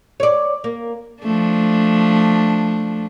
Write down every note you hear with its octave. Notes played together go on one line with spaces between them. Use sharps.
C#5 D5
A#3
F3 A3 D4